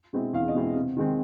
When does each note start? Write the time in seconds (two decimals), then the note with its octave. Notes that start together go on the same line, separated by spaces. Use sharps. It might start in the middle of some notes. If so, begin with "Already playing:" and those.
0.13 B2 G#3 C4 E4
0.33 E2 F5
0.48 D#5
0.55 B2 G#3 C4 E4
0.76 C3
0.96 D#3 G#3 C4